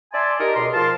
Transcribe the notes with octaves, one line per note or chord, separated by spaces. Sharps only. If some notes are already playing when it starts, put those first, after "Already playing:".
D5 E5 G#5 A5 C6
D#4 G4 A#4
C#2 B2 C6
F3 A#4 F5 A5 C6